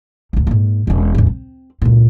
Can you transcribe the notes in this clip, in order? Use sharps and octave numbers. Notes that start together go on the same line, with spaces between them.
A1 D2
G#2 A#3
E1 C#4
E2 A2
C4
C#2 A#2